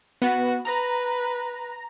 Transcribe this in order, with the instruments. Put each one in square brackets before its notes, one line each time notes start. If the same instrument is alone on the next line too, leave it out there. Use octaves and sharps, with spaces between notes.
[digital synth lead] B3 [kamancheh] F#4
[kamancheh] B4 [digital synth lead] A#5